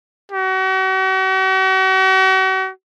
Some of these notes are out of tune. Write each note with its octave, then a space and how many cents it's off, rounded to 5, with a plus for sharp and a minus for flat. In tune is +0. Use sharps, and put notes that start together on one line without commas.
F#4 +40